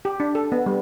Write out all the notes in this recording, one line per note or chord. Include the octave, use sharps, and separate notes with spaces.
G4
D4
A4
B3
G3